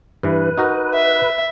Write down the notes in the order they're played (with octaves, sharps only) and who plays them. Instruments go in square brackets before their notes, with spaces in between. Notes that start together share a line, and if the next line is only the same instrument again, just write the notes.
[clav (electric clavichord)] G2 E3 [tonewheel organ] B4
[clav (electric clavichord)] D#4 F#4 A#4
[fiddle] E5